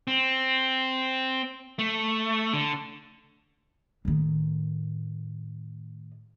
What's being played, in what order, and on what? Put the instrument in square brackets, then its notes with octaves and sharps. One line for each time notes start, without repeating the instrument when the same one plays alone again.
[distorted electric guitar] C4
A3
D3
[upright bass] A2 D#3